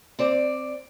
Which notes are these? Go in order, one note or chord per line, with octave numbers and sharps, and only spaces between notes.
C4 D5